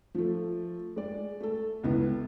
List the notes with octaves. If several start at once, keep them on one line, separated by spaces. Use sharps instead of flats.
F3 A3
G#3 D5
A3 A4
C#2 B3 E4